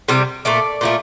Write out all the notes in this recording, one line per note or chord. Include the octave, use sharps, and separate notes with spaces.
C3 G3
A#2 A3 D5
A#2 F3 A3